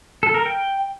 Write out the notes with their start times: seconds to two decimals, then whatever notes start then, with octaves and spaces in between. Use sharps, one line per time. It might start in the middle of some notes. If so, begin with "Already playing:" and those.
0.23 A4
0.34 A#4
0.46 G5